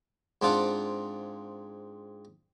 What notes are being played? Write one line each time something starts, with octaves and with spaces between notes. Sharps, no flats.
G#2 C4 D4 F4 F#5